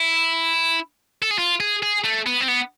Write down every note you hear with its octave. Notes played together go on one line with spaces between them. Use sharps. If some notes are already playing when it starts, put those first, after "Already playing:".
Already playing: E4
A4
G#4
F4
G#4
G#4
A3
B3
C4
B3